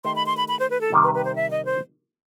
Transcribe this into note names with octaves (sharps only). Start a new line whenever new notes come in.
D#3 A3 D#4 G4 C6
B5
C6
B5
B5
C5
B4
A4
C3 D#3 G3
B4
B4
C5
E5
D#5
C5